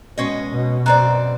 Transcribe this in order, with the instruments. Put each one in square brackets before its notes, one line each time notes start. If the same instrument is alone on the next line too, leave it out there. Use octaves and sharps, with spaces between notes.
[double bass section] B2 [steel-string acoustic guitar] G#3 C#4 D#5
[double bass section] B2
[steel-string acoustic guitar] F#2 C4 D5 [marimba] A#5 F#6